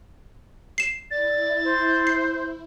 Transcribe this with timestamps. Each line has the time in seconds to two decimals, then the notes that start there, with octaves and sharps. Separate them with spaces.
0.78 C7 E7
1.11 E4 D5 A6
1.64 C5
2.07 C7